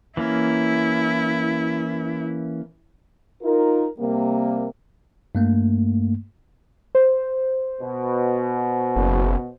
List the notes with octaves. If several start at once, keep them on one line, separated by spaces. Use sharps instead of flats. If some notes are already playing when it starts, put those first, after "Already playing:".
E3 A#3 C#4 E4
D#4 F4 A#4
C3 G3 A#3
G2 A3 A#3
C5
B2
F#1